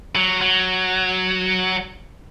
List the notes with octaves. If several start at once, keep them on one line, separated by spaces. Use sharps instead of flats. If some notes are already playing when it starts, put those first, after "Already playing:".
F#3
F#3